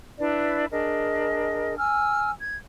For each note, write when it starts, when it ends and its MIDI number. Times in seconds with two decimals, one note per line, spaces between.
0.18 0.66 62
0.18 0.66 64
0.18 0.66 71
0.18 0.66 74
0.71 1.76 62
0.71 1.76 68
0.71 1.76 70
0.71 1.76 75
1.78 2.30 80
1.78 2.30 88
1.78 2.30 89
2.39 2.56 92